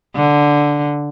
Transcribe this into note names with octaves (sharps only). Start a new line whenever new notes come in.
D3